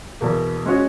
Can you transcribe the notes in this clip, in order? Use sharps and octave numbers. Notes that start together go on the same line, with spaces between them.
E2 B2 A#3
G#3 C#4 F#4 C#5